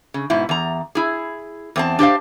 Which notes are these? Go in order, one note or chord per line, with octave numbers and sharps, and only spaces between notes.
C#3
G#2 B2 E4
E2 A#5
E4 G#4
E2 C4 A5
D4 G4 C5 F5